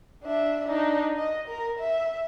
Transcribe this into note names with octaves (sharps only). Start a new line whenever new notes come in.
D4 E5
D4 D#4
D#5
A#4
E5